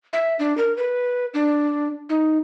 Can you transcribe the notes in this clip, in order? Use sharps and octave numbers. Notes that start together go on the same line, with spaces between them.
E5
D4
A#4
B4
D4
D#4